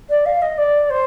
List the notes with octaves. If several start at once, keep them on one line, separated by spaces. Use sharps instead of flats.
D5
F5
D#5
D5
C5